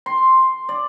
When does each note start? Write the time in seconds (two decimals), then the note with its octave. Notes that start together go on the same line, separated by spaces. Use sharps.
0.06 C6
0.69 D5